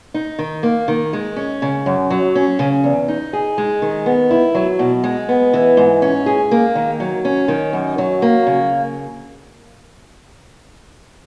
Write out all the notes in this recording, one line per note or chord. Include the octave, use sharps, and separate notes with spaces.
D#4
D#3
A#3
D#3
G#3
C#4
C#3
F#2
F#3
C#4
C#3
E2
D#4
G#4
G#3
D#3
B3
E4
F#3
B2
G#3
B3
E3
G#2
C#4
G#4
A#3
D#3
F#3
C#4
D#3
F#2
F#3
A#3
C#3